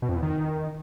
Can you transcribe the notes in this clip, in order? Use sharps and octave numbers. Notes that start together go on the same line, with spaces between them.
B2
F2
E2
D#3